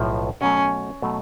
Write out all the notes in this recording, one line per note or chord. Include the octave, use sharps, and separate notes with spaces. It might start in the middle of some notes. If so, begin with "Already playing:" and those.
Already playing: B1 A2 F3
B2 F#3 A3 C#4
B2 F#3 A3